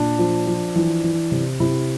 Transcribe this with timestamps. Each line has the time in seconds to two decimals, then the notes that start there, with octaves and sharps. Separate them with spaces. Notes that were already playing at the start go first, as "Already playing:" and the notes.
Already playing: A#2 D4
0.19 F3
0.47 F3
0.75 E3
1.04 E3
1.32 C3
1.60 C3 E4